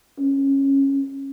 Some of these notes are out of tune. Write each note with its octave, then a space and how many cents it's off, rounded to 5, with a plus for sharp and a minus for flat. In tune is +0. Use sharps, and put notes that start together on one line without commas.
C#4 -15